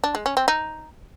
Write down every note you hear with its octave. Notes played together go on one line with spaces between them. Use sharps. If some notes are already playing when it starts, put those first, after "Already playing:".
D4
G#3
C#4
C4
D#4